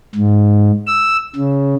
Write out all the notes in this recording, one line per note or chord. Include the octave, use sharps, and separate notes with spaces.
G#2
E6
C#3